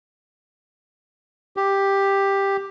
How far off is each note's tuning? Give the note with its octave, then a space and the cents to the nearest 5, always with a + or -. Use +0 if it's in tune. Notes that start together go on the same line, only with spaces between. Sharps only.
G4 +5